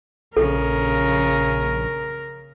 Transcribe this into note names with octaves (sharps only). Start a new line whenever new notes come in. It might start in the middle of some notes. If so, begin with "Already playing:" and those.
A#1 C#3 A4 A#4